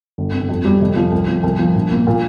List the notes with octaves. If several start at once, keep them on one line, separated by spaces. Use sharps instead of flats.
G1
C3
F2
G3
F1
F3
C2
F3
C2
F3
A#1
A#3
A#2